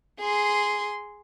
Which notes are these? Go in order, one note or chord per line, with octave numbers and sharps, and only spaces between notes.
G#4 C6